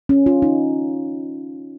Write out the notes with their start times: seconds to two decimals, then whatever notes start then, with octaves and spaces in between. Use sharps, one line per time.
0.09 C#4
0.26 F4
0.42 D#4